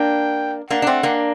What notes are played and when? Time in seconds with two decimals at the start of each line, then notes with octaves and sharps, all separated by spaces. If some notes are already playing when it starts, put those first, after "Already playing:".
Already playing: A#3 D4 G5
0.70 A#3 D4 F#5
0.82 D4
0.87 A3 C4
1.03 A#3 D4